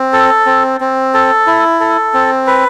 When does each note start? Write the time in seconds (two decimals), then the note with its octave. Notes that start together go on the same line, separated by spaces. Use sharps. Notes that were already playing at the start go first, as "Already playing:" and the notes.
Already playing: C4
0.13 A4
0.46 C4
0.81 C4
1.14 A4
1.47 E4
1.80 A4
2.14 C4
2.47 B4